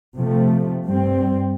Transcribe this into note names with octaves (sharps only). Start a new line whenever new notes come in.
C3 F3 A3
G2 G3 C4